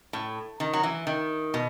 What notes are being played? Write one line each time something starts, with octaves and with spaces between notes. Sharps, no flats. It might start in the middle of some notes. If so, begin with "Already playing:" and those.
A2
D#3
F#3
E3
D#3
B2